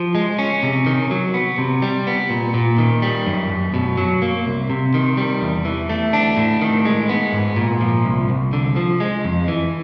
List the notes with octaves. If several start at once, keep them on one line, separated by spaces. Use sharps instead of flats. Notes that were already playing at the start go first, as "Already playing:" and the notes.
Already playing: F3
G#3
C#4
C3
D#3
F#3
B3
C3
G3
B3
A#2
A#2
D#3
G3
F#2
F#2
B2
F#3
A#3
C2
C3
D#3
G3
E2
E3
A3
D4
A2
D#3
G#3
B3
G#2
A#2
F3
C2
C2
D3
F3
G#3
F2
E3